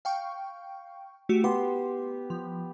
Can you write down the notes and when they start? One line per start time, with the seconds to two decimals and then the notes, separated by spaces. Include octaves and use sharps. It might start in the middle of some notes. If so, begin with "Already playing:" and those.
0.05 F5 G5 C#6
1.29 A3 F#4 G4
1.44 B3 G4 C6
2.30 F3